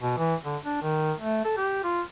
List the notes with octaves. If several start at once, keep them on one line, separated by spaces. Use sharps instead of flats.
B2
E3
D3
D4
D#3
A3
A4
G4
F4